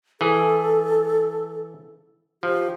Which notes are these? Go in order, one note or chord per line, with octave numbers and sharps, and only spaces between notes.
E3 G#4 A4
F3 G4